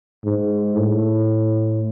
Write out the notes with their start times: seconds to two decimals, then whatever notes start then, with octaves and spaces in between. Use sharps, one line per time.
0.25 G#2
0.77 A2